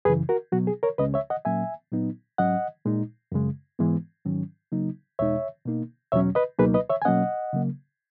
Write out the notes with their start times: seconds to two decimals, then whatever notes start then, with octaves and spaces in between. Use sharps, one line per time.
0.05 F#2 C#3 E3 G#4 B4
0.29 F#4 A#4
0.52 B2 F#3 B3 F#4
0.67 G#4
0.83 A#4 C#5
0.98 C#2 C#3 G#3 C#4 B4 D#5
1.14 C#5 E5
1.30 D#5 F#5
1.45 A#2 F#3 A#3 C#4 E5 G#5
1.92 A#2 F#3 B3 D#4
2.38 G#2 F#3 C#4 D#5 F#5
2.85 A#2 G#3 D#4
3.32 F#2 C#3 G#3
3.79 G#2 E3 G#3 B3
4.25 G#2 D#3 F#3 C#4
4.72 C#3 F#3 A#3 D#4
5.19 E2 B2 G#3 D#4 C#5 E5
5.65 B2 A#3 D#4
6.12 E2 B2 F#3 C#4 C#5 E5
6.35 B4 D#5
6.59 C#2 B2 F#3 A#3 D#4 G#4 B4
6.74 B4 D#5
6.89 C#5 E5
7.02 G#5
7.05 B2 F#3 A#3 C#4 D#5 F#5
7.53 C#3 F#3 A#3